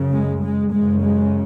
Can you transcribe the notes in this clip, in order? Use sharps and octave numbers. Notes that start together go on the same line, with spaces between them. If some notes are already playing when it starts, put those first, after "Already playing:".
Already playing: F#2 C#3
G#3
G#3
F#2 C#3 G#3
G#3